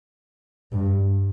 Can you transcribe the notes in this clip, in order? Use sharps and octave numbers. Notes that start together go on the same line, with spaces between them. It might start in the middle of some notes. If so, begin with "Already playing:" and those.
G2